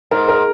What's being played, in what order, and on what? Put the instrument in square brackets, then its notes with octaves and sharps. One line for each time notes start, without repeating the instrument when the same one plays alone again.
[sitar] G#2 [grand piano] A#4
[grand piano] A#4